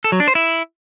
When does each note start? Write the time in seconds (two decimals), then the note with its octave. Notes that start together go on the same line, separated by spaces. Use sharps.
0.04 A4
0.12 F#3
0.20 D4
0.28 C5
0.35 E4